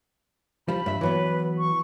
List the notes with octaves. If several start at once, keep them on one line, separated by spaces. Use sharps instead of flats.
F3 G3 B5
G2 E5
E3 F#3 B3 B4
C#6